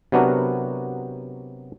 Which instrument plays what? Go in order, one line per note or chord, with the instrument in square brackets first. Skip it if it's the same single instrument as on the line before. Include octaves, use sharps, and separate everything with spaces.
[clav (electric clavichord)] C3 F#3 B3 D4 F#4 A#4